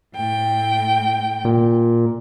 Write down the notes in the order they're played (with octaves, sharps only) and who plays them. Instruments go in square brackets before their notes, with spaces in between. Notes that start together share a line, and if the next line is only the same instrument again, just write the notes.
[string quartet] A2 G5
[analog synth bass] A#2